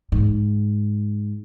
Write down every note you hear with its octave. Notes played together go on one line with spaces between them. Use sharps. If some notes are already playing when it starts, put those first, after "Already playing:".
G#2